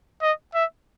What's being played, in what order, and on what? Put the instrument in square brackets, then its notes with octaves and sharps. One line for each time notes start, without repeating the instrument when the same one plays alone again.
[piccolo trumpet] D#5
E5